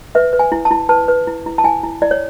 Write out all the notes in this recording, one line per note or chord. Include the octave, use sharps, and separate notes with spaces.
B4 E5
B4
G#5
E4
A5
E4
B4 A5
B4
E4
E4
A5
E4 G#5
E4
E4 D5
C#5